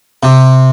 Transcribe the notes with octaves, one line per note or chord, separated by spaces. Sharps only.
C3